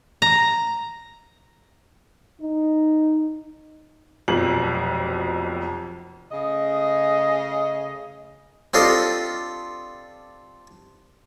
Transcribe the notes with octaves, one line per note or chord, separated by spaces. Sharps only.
A#5
D#4
F1 B1 F2 F#7
C#3 A3 D#5
C4 D4 F4 G4 A4 D#5